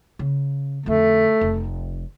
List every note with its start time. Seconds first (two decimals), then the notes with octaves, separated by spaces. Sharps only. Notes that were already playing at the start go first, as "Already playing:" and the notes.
0.19 C#3
0.86 F2 D3 A3
1.41 F1